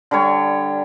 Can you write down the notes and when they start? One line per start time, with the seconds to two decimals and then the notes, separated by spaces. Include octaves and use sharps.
0.11 D3 G3 C#5